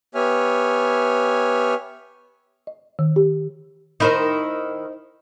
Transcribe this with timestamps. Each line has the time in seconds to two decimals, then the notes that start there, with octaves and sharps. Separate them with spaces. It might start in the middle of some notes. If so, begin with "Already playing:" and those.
0.15 B3 G4 C#5 E5 G#5 F6
2.67 D#5
2.99 D#3
3.16 G4
4.00 D#3 D#4 E4 A#4 C5